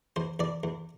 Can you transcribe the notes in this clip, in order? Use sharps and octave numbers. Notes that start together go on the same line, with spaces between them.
E2 C5
E2 D5
E2